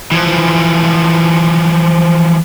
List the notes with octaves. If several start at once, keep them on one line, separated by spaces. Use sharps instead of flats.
E3 F3